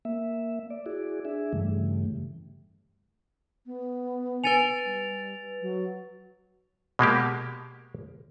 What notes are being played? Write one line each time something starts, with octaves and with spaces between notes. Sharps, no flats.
A#3 E5
D5
E4 F#4 G#4 D5
D4 G#4 E5
G2 C#3 E3 G3 A3
B3
B4 G#5 A6 C#7 D#7 F7
G3
F#3
B2 G#3 A#3 G4